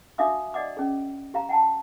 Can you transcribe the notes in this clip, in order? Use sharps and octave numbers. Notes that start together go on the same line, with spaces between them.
D4 F#4 E5 F5 D6 D#6
D5 D#5 F#5 D6
C#4 G#4
G4 F5 A#5
F#5 G5 A5